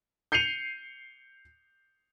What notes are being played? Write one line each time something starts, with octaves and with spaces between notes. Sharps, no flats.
G6 C7 C#7 D#7 F7